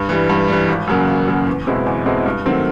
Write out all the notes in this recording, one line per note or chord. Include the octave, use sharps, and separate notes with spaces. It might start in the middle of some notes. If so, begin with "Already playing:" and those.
Already playing: G2
E3 G3
G2
E3 G3
G#1
F#2 C#3 F#3 A#3
G#1
F#2 C#3 F#3 A#3
E2
B2 G#3 C4 E4
E2
B2 G#3 C4 E4
G2
D#3 F#3 A3 C4